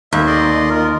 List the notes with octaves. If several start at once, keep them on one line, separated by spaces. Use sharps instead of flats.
D#2 E5
D5 D#5 C6
F4 A#4